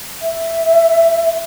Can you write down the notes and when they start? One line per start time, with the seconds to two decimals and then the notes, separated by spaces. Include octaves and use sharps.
0.21 E5